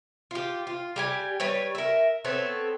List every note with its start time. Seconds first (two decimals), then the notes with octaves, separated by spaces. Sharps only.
0.31 F4 G4
0.67 F4
0.96 G3 G4 G#5
1.40 G3 B4 C#5
1.75 A#4 E5
2.25 B3 C4 A4 C#5